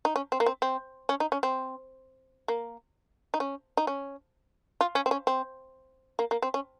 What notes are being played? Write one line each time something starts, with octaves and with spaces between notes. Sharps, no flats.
D#4
C#4
C4
A#3
C4
C4
C#4
D#4
C#4
C4
A#3
D#4
C#4
D#4
C#4
F4
C#4
C4
C#4
C4
A#3
A#3
C4
C#4